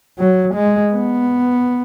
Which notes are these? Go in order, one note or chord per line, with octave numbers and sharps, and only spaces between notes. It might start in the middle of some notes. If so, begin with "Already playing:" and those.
F#3
G#3
B3